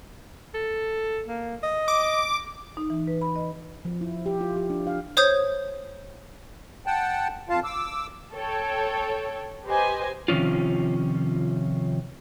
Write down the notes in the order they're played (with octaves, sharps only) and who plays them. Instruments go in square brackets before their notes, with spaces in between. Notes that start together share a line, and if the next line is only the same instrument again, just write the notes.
[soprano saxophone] A4
A#3
D#5
[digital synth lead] D6
[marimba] D#4
E3
B4
B5
D#5
[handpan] F3
E4
G4
F4
G4
D4
F5
[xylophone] C5 C#5 D#6 G6 G#6
[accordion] F#5 G5 A5
F2 F4 F5 A5
D6 E6
[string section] A4 C#5 G5
G4 B4 C5 D#5 G#5
[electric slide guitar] C3 D#3 F3 C#4 F4